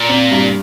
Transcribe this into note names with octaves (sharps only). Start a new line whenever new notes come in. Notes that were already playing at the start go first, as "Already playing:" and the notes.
Already playing: A#2
C4
G2